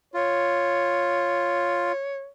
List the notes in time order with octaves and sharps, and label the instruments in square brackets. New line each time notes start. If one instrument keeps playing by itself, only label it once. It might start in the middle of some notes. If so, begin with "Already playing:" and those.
[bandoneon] F4 [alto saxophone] C#5